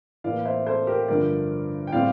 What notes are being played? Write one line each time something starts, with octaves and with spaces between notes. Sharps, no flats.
A2 E3 A#3 D5 F5
C5 E5
A4 C5
G4 A#4
G2 D3 F3 A#4 D5
G5
A2 G3 C4 D5 F5